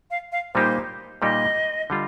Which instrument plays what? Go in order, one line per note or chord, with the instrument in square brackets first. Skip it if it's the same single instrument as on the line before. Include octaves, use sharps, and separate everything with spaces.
[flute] F5
F5
[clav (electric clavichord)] A#2 G3 A#3 D#4 G4 [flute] C5
[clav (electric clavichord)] A#2 G3 A#3 D#4 G4 [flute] D#5
[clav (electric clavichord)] D3 G3 F4